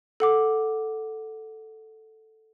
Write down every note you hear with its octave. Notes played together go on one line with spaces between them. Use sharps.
A4 F#5 D6